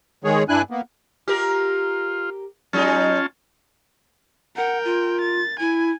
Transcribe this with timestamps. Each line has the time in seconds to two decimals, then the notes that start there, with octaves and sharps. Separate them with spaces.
0.24 D#3 G#3 G#4 C#5
0.49 G2 D4 E4 G#5 F#6
0.71 A#3 B3
1.28 F4 G4 A#4
2.73 F#3 G#3 C#4 D#4 F4 A5
4.56 A#4 F#5 G5
4.85 F4
5.21 A6
5.60 E4 G#5